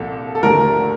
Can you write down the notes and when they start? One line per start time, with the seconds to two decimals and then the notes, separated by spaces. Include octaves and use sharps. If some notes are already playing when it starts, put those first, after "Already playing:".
Already playing: C2 A#2 F3 A4
0.35 A4
0.43 D#2 D3 F3 A3 A#4